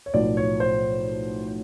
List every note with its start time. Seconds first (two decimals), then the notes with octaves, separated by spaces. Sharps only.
0.06 C#5
0.14 B1 A2 F3 D5
0.37 C#5
0.60 C5